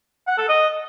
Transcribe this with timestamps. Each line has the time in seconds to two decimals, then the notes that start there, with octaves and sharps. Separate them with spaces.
0.27 F#5
0.38 A4
0.49 D#5